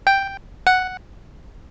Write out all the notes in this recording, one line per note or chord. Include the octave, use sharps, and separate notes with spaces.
G5
F#5